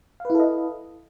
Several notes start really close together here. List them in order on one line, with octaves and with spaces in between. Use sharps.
F5 B4 E4 A4 D#5